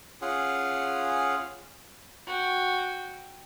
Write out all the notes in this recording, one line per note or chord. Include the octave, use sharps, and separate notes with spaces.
C#4 F4 G#4 F#5
F#4 G5